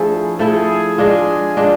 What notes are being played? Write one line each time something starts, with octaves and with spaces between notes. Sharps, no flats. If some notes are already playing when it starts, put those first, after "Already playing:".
Already playing: F3 A3 D4 E4 G#4 A4
F3 A3 E4 G#4 A4
G#3 D4 F4
G#3 D4 F4